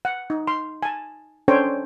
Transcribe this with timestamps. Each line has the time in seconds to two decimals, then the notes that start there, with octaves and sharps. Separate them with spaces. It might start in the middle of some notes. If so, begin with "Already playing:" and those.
0.05 F#5
0.30 D#4
0.47 C6
0.83 G#5 A5
1.48 C#4 D4 A4 C5 C#5 G5